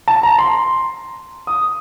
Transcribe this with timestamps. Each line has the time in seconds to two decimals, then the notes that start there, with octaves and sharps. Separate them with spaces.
0.08 A5
0.23 A#5
0.38 C6
1.47 D#6